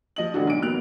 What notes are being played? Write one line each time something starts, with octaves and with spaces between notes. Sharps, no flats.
F3 D#5 F#7
A1 D3 D4 F#4
B1 D7
A1 F#3 A#3 B3 F#6 F7